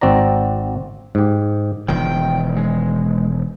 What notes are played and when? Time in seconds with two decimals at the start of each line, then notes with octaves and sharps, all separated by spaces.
0.01 G#1 C4 F#4 D5 A#5
1.15 G#2 G4
1.88 E1 D#3 F3 G5
2.57 G#3